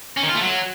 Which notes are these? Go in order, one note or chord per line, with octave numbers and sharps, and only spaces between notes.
C#4
D#3
F4
A3
F#3